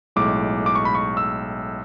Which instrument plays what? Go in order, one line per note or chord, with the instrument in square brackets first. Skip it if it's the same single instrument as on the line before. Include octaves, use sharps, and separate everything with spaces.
[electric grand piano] B1 A2 G#3 D6
D6
C#6
B5
C#6
E6